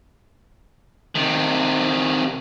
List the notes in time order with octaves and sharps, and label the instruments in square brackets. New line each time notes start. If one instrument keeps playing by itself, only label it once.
[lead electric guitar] C3 D#3